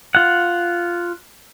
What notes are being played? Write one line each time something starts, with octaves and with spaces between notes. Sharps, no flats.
F4 F#5